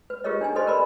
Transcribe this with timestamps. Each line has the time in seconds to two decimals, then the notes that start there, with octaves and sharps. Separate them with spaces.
0.10 B4
0.24 F4 G4 G#4 A#4 C#5 D#5
0.41 D4 D#4 G#5
0.55 G4 A4 B4 C5 D#5 C6
0.67 A#4 B4 D5 B5 C6